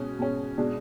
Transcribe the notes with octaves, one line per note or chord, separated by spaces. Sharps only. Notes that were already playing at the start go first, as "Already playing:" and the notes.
Already playing: B2 G#3 C#4
B2 G#3 C#4
B2 G#3 D4